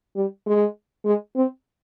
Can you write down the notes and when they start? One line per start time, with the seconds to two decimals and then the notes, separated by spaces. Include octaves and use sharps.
0.16 G3
0.46 G#3
1.05 G#3
1.36 C4